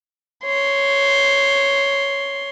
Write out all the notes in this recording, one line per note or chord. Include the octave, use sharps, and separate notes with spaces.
C#5 C6